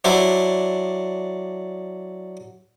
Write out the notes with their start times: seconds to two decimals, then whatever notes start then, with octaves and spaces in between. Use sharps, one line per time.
0.04 F#3 D4 E4 C5